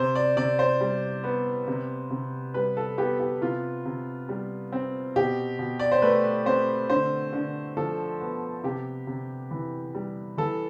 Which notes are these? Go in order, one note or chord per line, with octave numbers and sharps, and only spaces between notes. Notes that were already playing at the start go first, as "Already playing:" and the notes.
Already playing: C3 C5
D5
C3 D5
C5
G3
B3
C3
C3
G3 B4
A4
B3 G4
G4
C3 F4
C3
G3
C4
B2 G4
B2
D5
C5
A3 B4
C4 C5
D3 C5
D3
F3 A4
B3
C3 G4
C3
E3
G3
E3 A4